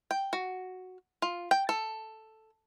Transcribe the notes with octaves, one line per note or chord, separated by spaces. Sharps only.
G5
F#4
F4
G5
A4